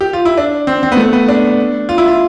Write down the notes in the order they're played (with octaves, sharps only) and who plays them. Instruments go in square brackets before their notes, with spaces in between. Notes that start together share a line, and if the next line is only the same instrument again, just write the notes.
[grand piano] G4
F4
E4
D4
C4
C4
B3
A3
B3
D4
F4
E4
F4